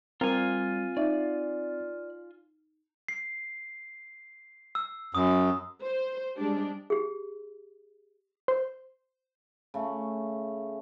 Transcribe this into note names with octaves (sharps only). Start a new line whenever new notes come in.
G3 C4 F4 A#4 C5 G#5 A#5
D#4 D5 E5
C7
E6
F#2 D#6
C5
G3 G#3 D4 G4
G4 G#4
C5
C#3 A3